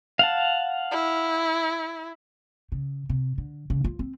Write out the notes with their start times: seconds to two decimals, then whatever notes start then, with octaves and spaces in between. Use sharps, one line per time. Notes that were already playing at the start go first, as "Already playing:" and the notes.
0.19 F5 F#5 A5
0.91 E4
2.72 C#3
3.09 C3
3.38 D3
3.70 C#3
3.84 F4
3.99 C4